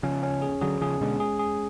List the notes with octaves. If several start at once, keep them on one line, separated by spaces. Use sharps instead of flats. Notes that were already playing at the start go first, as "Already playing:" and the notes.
C#3 F3 C#4
C#4
G#4
D3 F#3 G#4
C#3 F3 G#4
B2 D3 G#3
G#4
G#4